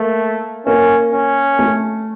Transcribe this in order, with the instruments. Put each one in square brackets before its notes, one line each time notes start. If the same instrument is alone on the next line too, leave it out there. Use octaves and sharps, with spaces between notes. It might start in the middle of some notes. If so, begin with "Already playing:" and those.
Already playing: [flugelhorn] A3 [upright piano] A#3
[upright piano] A#3 [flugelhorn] C#4
[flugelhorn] C#4
[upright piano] A3